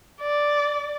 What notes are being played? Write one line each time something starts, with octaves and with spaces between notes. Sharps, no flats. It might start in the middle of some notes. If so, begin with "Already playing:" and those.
D5